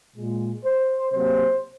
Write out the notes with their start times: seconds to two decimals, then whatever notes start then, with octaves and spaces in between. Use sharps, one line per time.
0.16 A#2 G#3
0.64 C5
1.11 C3 F#3 A#3 C5